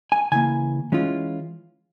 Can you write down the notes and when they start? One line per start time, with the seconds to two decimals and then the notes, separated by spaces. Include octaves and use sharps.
0.12 G#5
0.32 C#3 E3 A#3 G#5
0.92 E3 G#3 C#4 F4